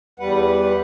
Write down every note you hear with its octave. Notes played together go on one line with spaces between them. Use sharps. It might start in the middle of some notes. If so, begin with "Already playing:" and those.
E2 G3 B4 F#5